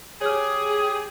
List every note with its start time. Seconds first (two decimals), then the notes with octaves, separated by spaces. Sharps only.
0.21 G4 G#4 C#5 F6